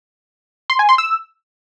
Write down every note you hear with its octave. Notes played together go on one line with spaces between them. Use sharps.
C6
G#5
C6
E6